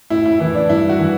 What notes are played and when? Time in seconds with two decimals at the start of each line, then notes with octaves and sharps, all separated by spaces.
0.10 A2 E4
0.26 E4
0.39 E3 E4
0.55 D4
0.69 G2 E4
0.89 F#4
0.99 E3